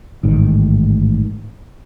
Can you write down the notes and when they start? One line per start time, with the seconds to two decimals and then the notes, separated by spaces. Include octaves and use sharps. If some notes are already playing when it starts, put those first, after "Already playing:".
0.23 A1 G#2 D#3